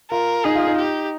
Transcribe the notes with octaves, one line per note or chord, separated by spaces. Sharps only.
F4 A#4
D#4 G#4
F4
D#4
G4